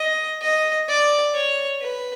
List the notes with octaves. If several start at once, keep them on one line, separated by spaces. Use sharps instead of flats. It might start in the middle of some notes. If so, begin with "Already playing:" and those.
Already playing: D#5
D#5
D5
C#5
B4